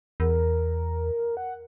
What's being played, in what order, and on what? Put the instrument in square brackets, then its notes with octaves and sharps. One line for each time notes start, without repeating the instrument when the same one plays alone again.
[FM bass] E2 [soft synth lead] A#4
[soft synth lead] F#5